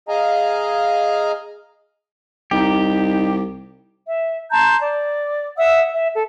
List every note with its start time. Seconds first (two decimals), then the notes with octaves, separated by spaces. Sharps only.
0.09 G#4 D#5 F5 G#5 A#5
2.51 C2 D#4 G4
4.06 E5
4.51 A5 A#5 C6 G6
4.79 D5
5.58 E5 F#5 D#6 E6
5.93 E5
6.13 A4